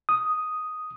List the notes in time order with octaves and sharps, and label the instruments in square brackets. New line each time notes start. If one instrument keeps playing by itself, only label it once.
[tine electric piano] D#6